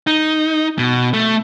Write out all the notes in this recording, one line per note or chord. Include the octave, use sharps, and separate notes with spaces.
D#4
B2
A3